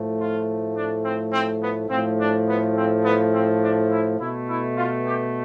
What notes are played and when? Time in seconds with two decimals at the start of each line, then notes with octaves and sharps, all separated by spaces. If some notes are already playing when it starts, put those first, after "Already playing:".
Already playing: A2 F3 A3
0.19 F4
0.76 D4
1.04 C4
1.32 C4
1.62 B3
1.90 A2 F3 A3 C4
2.19 D4
2.47 B3
2.75 C4
3.04 B3
3.33 C4
3.61 D4
3.90 E4
4.19 B2 A3 E4
4.47 E4
4.76 F4
5.05 G4